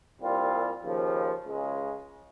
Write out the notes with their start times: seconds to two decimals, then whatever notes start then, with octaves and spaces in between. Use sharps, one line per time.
0.21 C2 A#2 G3 C4 F4
0.82 D#2 C#3 F3
1.45 C#2 C#3 G#3